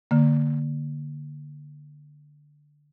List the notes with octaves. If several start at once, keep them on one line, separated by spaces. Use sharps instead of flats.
D3 A#3